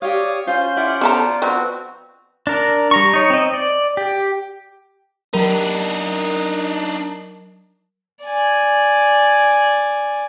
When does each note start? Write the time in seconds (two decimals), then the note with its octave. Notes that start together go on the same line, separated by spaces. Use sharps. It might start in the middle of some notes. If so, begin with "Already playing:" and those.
0.02 G4 C#5 D5 F5 D#6
0.47 C#4 F4 C5 G6
0.77 E4 F4 D5 F#5
1.01 B3 A4 D5 A#5 B5
1.42 F3 B3 C4 F#4 B4
2.47 D4 A#4
2.91 G3 A#5 C#6
3.13 D#4 C#5
3.30 C4 D#5
3.54 D5
3.97 G4
5.33 F#3 D4 D#4 A#4
8.24 D5 G#5